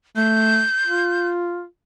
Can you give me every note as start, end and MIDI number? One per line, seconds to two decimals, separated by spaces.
0.16 0.63 57
0.16 1.28 91
0.87 1.65 65